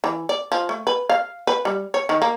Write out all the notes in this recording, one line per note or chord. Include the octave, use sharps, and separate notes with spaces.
E3
D5
F3
A3
B4
F5
B4
G3
C#5
D#3
A#3